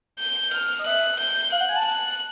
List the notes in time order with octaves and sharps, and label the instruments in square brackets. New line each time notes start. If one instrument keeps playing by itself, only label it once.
[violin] G6
F6
[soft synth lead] D#5
[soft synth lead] E5 [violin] F#6
[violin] G6
[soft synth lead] F5 [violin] F#6
[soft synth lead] F#5
G#5
A5
[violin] F#6